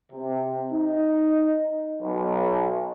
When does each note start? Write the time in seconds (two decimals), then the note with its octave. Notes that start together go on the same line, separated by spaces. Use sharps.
0.12 C3
0.70 D#4
2.02 B1